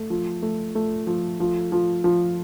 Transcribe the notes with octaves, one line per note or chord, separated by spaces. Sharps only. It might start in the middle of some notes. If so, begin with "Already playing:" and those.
Already playing: A3
F3
A3
A3
F3
F3
F3
F3